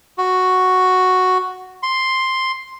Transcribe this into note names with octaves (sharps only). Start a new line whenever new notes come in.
F#4
C6